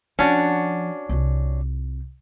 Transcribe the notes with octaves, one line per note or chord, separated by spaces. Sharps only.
F3 C#4 D4 F#4
C2 F4